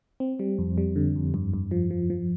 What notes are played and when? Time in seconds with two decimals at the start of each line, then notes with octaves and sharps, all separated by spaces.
0.20 C4
0.39 G3
0.59 F2
0.78 G3
0.96 D3
1.16 F2
1.34 G2
1.54 G2
1.71 F3
1.91 F3
2.10 F3